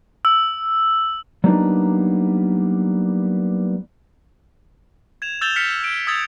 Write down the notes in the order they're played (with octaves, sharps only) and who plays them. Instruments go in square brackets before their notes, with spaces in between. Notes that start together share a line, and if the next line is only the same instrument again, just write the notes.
[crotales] E6
[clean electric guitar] F#3 G3 A#3 B3 D4 D#4
[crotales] G#6 E7 F7
E6 G6 A6 E7 F7 G7
F6 B6 C#7 G7
D7
D#6 E6 G#6 A6 F7